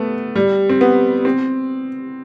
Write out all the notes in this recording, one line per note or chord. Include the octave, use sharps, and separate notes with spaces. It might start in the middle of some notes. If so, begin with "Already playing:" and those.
Already playing: A3 B3
G3
C4
B3
C4